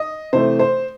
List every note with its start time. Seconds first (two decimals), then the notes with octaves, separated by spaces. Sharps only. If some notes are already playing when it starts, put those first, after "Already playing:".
Already playing: D#5
0.33 C3 E3 A3 C5
0.59 C5